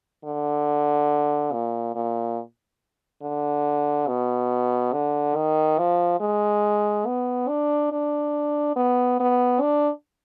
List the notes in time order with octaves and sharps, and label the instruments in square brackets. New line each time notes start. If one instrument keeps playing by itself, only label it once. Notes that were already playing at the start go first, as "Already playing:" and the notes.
[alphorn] D3
A#2
A#2
D3
B2
D3
D#3
F3
G#3
B3
D4
D4
B3
B3
D4